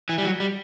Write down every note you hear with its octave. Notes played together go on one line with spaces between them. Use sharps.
E3
G3
F#3
G3